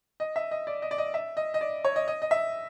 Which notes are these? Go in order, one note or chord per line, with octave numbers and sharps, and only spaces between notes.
D#5
E5
D#5
D5
D#5
D5
D#5
E5
D#5
D#5
D5
C#5
D#5
D#5
D#5
E5